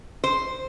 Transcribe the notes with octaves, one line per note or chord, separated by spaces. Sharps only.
C5